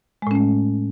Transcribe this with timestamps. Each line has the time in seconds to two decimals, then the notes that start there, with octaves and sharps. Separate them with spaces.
0.22 G#3
0.27 A2
0.31 C#4
0.35 A3